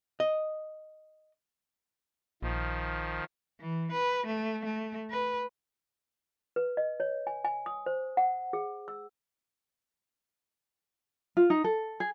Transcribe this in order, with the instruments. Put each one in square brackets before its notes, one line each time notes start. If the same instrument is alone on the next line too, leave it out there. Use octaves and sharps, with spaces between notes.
[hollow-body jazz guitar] D#5
[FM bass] A#1 [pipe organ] D#3 F3
[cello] E3
B4
A3
A3
B4
[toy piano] B4
D#5
C#5
G#5
G#5
D#6
C5
F#5
G#4
E6
[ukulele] F4
D#4
A4
G#4